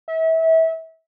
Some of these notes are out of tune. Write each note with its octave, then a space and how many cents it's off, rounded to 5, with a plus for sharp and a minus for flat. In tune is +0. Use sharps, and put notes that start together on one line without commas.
E5 -30